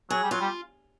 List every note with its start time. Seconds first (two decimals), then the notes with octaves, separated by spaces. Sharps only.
0.10 F#3 G#4
0.23 G3
0.31 F#3 F4
0.40 G3